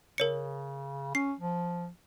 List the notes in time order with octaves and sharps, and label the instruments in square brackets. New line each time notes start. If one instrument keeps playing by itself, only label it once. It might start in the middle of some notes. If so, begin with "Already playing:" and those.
[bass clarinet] C#3 [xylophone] A#4 C#5 C#7
[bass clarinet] C#4 [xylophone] C7
[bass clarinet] F3